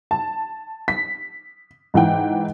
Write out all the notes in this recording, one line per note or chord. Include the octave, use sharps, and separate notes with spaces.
A5
B6
G#2 E3 F#5 G5